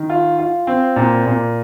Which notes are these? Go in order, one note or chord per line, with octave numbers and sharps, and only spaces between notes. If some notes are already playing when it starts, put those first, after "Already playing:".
Already playing: D#3
F4
F4
C4
A#2
A#2